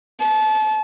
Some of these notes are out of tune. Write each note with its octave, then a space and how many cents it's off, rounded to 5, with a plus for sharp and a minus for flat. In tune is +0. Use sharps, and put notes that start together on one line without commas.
A5 -30